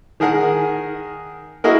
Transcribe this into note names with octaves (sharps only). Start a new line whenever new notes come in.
D#3 G#4 A#4 F#5 G#5
A#3 E4 F#4 G#4 A#4 D#5